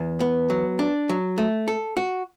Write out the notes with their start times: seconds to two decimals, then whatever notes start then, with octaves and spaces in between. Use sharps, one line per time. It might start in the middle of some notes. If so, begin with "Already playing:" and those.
Already playing: E2
0.20 B3
0.50 F#3
0.79 D4
1.09 F#3
1.38 A3
1.68 A4
1.97 F#4